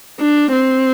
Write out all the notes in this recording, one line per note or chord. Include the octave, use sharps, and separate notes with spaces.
D4
C4